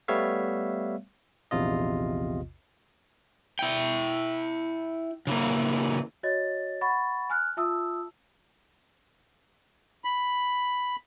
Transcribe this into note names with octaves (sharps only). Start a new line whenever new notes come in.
G3 A3 B3 C#5 E5 F5
A#1 E2 C3 F4 D#5
E4 G5
C#3 E3 A#3
F#4 C#5 D#5 A6
F#5 B5 C#6 A6
G#5 F6 F#6
F4 E5 A5 D#6 E6
B5